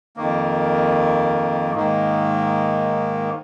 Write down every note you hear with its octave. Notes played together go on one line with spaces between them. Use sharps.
F2 D#3 A#3
G#2 D#3 A#3